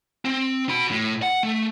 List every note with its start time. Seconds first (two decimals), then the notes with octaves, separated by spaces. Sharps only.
0.25 C4
0.69 F#4 B5
0.91 A2
1.22 F#5
1.43 A3